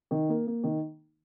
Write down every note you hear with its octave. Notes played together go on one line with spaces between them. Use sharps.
D#3
A#3
A#3
D#3